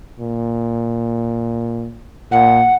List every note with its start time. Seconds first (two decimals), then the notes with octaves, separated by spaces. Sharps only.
0.20 A#2
2.32 A#2 F#5